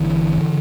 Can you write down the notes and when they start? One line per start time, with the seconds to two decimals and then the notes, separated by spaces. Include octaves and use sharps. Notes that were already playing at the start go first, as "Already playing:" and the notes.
Already playing: G1 G2 D3 E3
0.38 D3